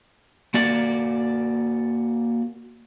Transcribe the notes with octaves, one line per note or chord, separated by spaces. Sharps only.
A#3 F#4 D5